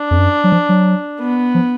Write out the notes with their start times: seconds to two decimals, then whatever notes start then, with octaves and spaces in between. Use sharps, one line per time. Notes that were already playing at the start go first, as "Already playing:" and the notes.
Already playing: D4
0.11 F2
0.18 F#2
0.44 F#3
0.52 F3
0.69 F#3
1.20 B3
1.54 F3